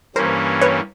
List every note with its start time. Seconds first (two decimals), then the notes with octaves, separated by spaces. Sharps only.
0.16 G2 E3 G3 A#3 C#4 A#4 C5
0.61 B4 C#5